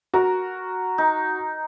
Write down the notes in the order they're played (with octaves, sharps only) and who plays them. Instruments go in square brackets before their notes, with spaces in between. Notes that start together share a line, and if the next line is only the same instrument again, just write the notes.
[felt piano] F#4 [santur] A#4
[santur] D#4